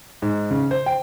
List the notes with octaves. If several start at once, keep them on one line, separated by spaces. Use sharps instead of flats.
G#2
C#3
C5
G5